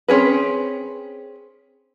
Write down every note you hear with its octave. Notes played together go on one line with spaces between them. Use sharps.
C4 C#4 G#4 B4